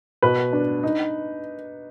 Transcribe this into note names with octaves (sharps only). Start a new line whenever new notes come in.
B2 B4
D4
D#4